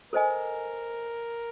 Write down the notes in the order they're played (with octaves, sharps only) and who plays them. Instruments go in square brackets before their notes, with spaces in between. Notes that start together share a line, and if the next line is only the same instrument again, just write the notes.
[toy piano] A4 C5 D#5 G#5 [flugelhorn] A#4